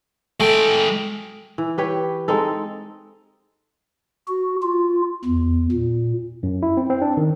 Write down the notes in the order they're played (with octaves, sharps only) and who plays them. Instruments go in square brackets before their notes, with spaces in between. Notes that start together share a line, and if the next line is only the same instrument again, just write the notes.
[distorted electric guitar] G#3 G5 [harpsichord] A3
[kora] E3
G4 B4 C#5 G5
G#3 C4 D#4 A4
[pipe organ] F#4
F4
E2
A#2
[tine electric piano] F#2
E4
C4
C4
D4
D#3